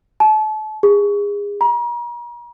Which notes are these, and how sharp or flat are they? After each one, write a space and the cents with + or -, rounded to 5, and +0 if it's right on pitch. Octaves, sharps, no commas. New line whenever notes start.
A5 -35
G#4 -30
A#5 +40